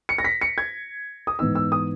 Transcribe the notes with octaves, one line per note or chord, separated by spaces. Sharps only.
C#7
A#6
B6
C#7
G#6
D#6
G#2 E3 B3 D#4 E6
E6
D#6